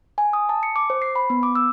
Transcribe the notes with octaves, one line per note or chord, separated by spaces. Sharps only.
G#5
D#6
A5
C#7
D6
C5
C7
B5
B3
D6
E6